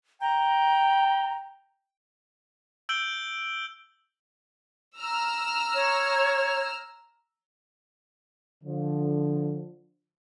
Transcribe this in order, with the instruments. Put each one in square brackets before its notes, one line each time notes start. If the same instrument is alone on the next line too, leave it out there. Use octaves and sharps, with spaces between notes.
[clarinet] G5 [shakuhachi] A#5
[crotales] E6 G6 D7 F#7 G7
[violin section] A#5 E6 F6
[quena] C#5
[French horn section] D3 F3